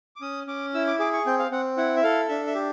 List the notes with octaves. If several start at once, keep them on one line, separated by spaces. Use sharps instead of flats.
D6
C#4 D#6
C#4 D6
E4 E6
D6
G#4 D6
C#6
C4 G5
F5
C4 F#5
E4 F#5
E5
A4 F5
D4 E5
E5
G4